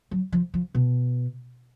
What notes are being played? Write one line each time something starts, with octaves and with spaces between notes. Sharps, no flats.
F#3
F3
F3
B2